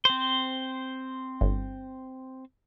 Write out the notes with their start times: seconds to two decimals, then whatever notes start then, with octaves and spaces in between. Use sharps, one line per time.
0.05 C4 C5
1.41 G1